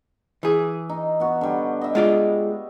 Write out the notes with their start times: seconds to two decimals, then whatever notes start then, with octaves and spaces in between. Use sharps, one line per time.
0.43 E3 G#4
0.89 D#4
1.20 B3 F#4
1.41 D3 G3
1.81 D#5 E5
1.95 G#3 F4 D5